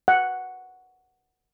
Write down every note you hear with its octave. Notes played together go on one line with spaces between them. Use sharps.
F#5